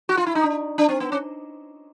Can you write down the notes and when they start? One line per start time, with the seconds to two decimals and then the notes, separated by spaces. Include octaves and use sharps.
0.09 F#4
0.17 F4
0.26 E4
0.35 D#4
0.43 D4
0.78 D4
0.89 C4
1.00 B3
1.12 C#4